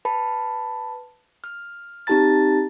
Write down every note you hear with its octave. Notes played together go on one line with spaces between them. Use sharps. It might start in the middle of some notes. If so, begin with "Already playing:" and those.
B4 A5 B5
F6
C4 D#4 G4 A5 A#5 A6